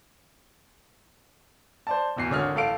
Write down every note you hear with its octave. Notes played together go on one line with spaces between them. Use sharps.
C5 D5 A5
D1 E2 C7
G#1 D3 C#5 D#6 F6
A1 A4 F5 D7